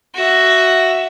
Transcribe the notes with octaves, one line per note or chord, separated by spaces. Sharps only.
F#4 E5